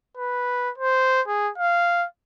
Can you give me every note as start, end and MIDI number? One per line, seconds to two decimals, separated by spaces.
0.17 0.71 71
0.78 1.22 72
1.27 1.51 68
1.58 2.06 77